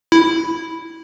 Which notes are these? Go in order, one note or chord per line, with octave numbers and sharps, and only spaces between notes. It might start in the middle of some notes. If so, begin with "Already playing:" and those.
E4